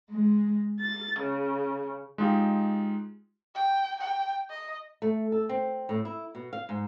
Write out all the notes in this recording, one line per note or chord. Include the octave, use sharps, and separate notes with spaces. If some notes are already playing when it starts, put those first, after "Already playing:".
G#3
A6
C#3
G#3 D#4 F4 G4
G5
G5
D#5
A3
A4
C4
A2
E4
B2
F5
G#2